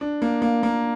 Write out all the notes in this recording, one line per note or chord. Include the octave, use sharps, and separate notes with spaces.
D4
A#3
A#3
A#3